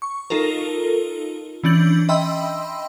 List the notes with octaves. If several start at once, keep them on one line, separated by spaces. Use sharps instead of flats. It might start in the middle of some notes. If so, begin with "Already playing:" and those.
C#6
D#4 F4 A4 A#4
E3 C#4 D4 G6 F#7
D#5 E5 G5 B5 C6 E6